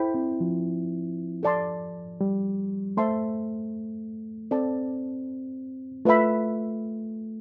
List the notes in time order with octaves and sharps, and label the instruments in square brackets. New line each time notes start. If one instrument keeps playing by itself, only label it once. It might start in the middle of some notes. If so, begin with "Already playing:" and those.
Already playing: [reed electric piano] E4 [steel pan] A4 C5 G5 B5
[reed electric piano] C4
F3
[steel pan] A4 D5 A5 C6
[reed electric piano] G3
[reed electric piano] A3 [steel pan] C5 E5 A5 C6
[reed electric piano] C4 [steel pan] A4 D5 A5
[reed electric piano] A3 [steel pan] F4 B4 E5 B5